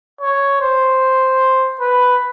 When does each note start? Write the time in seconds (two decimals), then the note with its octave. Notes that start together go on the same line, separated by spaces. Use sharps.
0.21 C#5
0.61 C5
1.80 B4